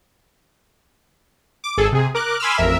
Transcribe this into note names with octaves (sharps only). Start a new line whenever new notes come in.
D6
G#1 G#4 A4
C3 G#4
A#4 D6 F#6
G#5 B5 C6 D6 E6 F6
A1 F2 A#4 E5